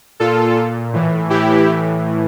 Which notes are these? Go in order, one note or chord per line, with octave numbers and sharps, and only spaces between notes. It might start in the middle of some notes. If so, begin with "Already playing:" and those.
A#2 F4 A4
A#2
A2 E3
A2 E3 E4 G4
A2 E3